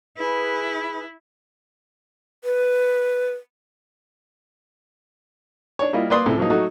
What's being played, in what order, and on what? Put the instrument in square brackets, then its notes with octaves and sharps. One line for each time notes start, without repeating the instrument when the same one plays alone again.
[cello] E4 [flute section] G#4 B4 B5
[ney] B4
[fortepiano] D4 C#5
G3 A#3 E4 F4 D#5
A#3 B4 D5 C6 D#6
C#2 A2 C3
F3 F#3 A#3 D#4
F#3 A3 D#4 F#4